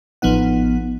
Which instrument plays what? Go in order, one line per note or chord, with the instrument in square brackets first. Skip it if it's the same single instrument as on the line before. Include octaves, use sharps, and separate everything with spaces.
[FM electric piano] A1 F3 B3 D#4 F#5